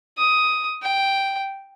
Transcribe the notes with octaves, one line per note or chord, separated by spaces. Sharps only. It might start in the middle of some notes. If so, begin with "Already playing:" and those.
D#6
G5